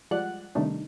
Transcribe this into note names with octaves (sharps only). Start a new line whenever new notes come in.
F3 G3 G#3 D5 F#5 F#6
C3 D#3 G3 A3 D4 D#4